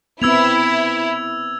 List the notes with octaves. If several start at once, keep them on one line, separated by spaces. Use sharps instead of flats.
B3 C4 E4 E6 G#6 F7